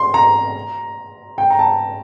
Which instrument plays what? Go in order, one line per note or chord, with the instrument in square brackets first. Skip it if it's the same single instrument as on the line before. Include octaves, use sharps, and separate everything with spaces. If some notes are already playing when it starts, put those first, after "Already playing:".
Already playing: [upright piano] C6
A#5
G5
A#5
A5